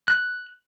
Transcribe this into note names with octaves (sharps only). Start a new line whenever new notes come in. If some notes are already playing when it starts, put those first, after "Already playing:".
F#6